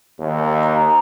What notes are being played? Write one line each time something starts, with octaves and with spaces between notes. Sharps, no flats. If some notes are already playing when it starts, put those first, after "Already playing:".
D#2
A#5